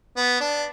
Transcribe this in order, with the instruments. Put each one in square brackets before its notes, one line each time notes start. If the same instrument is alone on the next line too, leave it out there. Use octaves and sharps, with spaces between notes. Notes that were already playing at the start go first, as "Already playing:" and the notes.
[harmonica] B3
D4